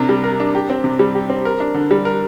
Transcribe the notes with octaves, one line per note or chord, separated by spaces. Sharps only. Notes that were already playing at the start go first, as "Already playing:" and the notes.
Already playing: C3 D4 A#4
G3
A#4
D4
G4
C4
C3
G3
G4
C4
A#4
D4
D3
G3
A#4